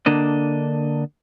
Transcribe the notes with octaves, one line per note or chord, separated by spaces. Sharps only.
D3 A#3 D4 D#5